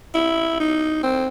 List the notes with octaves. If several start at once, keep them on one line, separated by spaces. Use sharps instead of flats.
E4
D#4
C4